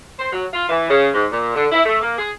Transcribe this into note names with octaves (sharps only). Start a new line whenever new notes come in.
C5
F#3
F4
E3
C#3
G#2
A#2
D3
E4
A3
A#3
G#4